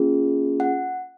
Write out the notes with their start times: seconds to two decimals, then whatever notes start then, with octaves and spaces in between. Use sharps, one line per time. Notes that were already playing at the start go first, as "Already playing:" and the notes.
Already playing: A#3 C#4 F4 G#4
0.60 F#5